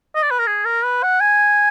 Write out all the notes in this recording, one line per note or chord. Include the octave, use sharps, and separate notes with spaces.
D#5
D5
B4
A#4
G#4
A#4
B4
F#5
G#5